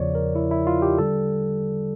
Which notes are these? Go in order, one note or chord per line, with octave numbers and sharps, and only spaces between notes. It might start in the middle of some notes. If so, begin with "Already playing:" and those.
Already playing: E2 C#3 F3 C#5 D5
A#4
E4
E4
F4
G4
D3 G3 A4